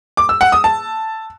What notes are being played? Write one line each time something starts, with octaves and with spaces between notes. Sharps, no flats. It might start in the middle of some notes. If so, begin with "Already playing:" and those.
D6
E6
F#5
D#6
A5